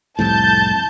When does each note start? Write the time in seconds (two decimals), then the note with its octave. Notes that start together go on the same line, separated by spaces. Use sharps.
0.19 C2 F2 A2 A5 G6